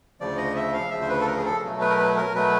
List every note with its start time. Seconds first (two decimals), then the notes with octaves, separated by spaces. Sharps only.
0.20 D2 C#3 F3 D5
0.37 D#5
0.56 E5
0.74 F5
0.91 D2 C#3 F3 E5
1.01 C5
1.09 B4
1.21 A4
1.27 A#4
1.37 G#4
1.45 A4
1.63 B2 F#3 A3
1.81 B4
1.90 A#4
1.99 B4
2.17 A#4
2.34 B2 F#3 A3 B4